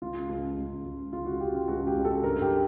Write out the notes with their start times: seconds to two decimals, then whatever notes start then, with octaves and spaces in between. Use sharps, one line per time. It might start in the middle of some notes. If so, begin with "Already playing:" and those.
0.02 C#2 F4
0.29 C#2
0.57 C#2
0.85 C#2
1.13 C#2 F4
1.26 F#4
1.41 C#3 G4
1.55 F4
1.68 C#2 F#4
1.87 G4
1.96 C#2
2.05 A4
2.24 G2 A#4
2.42 G4